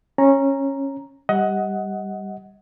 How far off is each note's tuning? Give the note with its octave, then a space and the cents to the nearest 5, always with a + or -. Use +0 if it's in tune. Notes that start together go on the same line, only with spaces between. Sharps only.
C#4 -15 A#5 +0
G3 +0 D#5 +25 F#5 +0